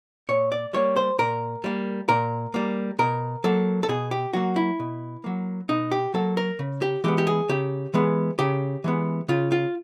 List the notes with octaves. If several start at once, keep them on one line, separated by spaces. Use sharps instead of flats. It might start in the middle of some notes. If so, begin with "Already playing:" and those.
A#2 C#5
D5
G3 A#3 C#5
C5
A#2 A#4
G3 A#3
A#2 A#4
G3 A#3
B2 A#4
F#3 A#3 A4
A4
B2 G#4
G4
F#3 A#3 F#4
E4
B2
F#3 A#3
B2 D#4
G4
F#3 A#3 A4
A#4
C#3
G4
E3 G#3 B3 G4
G4
G#4
C#3 G4
E3 G#3 B3
C#3 G4
E3 G#3 B3
C#3 F4
F4